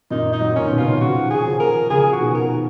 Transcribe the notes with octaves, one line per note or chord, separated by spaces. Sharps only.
F#2 A#2 D#4
D#4
D#3 F#3
A#2 C#4
B2
C#3 F4
D#3
C#3 F3 F#4
G#4
C#3 F3
A#4
C#3 F3 G#4
F#4
B2 D#3
A#4